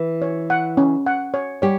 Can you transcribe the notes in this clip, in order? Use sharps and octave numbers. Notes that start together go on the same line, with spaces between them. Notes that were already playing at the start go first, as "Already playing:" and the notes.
Already playing: E3 E4
C#5
F#5
C#4
F#5
C#5
G3 G4 C#5